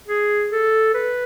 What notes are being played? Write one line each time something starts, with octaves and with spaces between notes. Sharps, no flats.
G#4
A4
B4